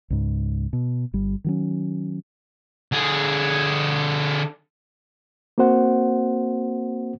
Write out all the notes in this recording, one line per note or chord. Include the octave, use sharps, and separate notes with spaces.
C#2 G#2
B2
G1 G3
D#3 F#3 C#4
D3 G#4
A#3 C4 F#4 C5 F#5